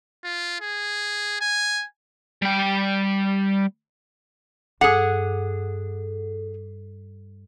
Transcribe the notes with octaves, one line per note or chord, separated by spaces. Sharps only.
F4
G#4
G#5
G3 G5
G2 G#4 A4 F#5